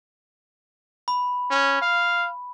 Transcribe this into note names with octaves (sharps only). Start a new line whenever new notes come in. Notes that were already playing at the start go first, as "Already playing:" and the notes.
B5
C#4
F5